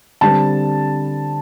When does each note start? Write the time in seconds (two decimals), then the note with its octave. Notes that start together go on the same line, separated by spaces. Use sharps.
0.21 D3 G3 C4 A5